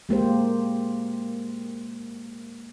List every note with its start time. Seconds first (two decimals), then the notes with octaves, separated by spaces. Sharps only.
0.09 G#3 A#3 G4 C5